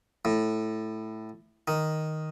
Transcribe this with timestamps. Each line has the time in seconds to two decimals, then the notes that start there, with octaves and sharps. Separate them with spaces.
0.25 A2
1.68 D#3